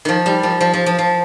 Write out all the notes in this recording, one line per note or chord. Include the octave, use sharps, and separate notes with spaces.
D#3 F3
G3
F3
F3
F3
F3
F3